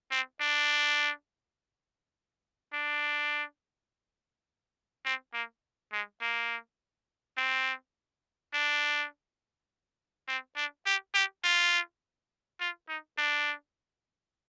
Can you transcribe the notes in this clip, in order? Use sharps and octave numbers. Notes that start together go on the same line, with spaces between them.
C4
D4
D4
C4
A#3
G#3
A#3
C4
D4
C4
D4
G4
G4
F4
F4
D#4
D4